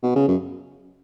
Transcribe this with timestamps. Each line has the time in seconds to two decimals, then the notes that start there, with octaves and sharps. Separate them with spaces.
0.03 B2
0.15 C#3
0.28 F#2